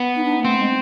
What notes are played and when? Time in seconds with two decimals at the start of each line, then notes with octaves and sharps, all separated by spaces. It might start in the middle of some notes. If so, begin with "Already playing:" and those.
Already playing: B3
0.15 D#4
0.24 D4
0.32 D#4
0.39 A#3
0.45 A3 C4
0.59 G#3